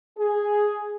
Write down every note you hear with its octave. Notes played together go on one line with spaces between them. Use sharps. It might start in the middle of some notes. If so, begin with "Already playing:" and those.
G#4